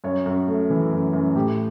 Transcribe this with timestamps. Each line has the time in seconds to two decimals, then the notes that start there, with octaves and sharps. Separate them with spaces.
0.04 F#2 C#5
0.26 F#2
0.48 A3
0.70 E3
0.92 F#2
1.13 F#2
1.35 A2 G4